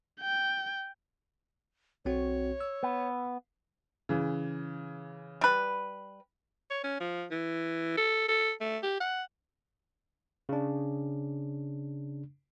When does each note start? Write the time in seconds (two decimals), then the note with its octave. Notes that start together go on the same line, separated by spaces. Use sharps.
0.20 G5
2.05 B1 C4 F#4 C#5
2.61 E6
2.83 B3
4.09 C#3 E3
5.41 G3 B4
6.70 C#5
6.84 C#4
7.00 F3
7.31 E3
7.97 A4
8.28 A4
8.61 A3
8.83 G4
9.00 F#5
10.49 C#3 D4